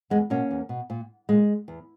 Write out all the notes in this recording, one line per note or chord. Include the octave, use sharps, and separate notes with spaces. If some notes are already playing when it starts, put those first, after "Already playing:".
E2 G#3 B3
B2 A#3 C#4
E2
B2
A#2
A#2 G#3
E2